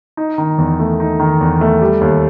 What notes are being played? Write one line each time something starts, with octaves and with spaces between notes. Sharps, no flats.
D#4
D#3
E2
A3
D#4
D#3
E2
A3
G3
D#2